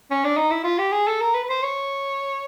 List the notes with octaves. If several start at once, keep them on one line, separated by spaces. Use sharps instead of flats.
C#4
D4
D#4
E4
F4
G4
G#4
A4
A#4
B4
B4
C5
C#5